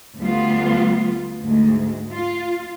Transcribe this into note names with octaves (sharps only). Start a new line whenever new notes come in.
D2 G3 A3 B3 F4
D2 G#2 G#3
F4